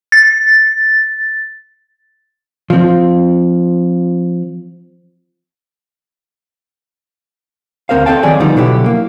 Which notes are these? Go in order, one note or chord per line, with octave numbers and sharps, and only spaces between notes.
A6
F3 C4
D2 C#3 C4 A#4 C5 F5
C4 A4 D#5 F5 G5 A5
D#3 F#3 G#4 D5 G#5
D3 F3 G3 B3 D#4
B2 D3 F#3 E4 G4
A#3